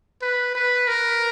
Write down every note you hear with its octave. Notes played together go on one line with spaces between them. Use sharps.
B4
B4
A#4